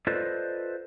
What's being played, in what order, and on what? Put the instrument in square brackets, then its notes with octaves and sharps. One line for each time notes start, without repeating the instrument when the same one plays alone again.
[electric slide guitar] F4 A4 B4 C5 D5 D#5